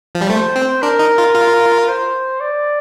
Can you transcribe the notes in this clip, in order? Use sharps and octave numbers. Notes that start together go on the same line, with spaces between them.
F3
G3
A3 C5
C4
D4 A#4
D#4
F4
F4
C5
D5